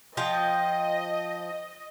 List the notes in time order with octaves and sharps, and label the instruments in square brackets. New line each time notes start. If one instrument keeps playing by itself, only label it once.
[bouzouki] F3 F4 G5 [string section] D#5